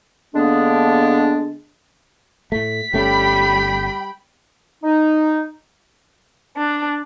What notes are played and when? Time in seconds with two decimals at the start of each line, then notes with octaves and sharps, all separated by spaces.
0.35 D3 G#3 A#3 B3 D4
2.52 A2 A3 B6
2.94 G1 G3 A3 C#4 G5 B5
4.83 D#4
6.56 D4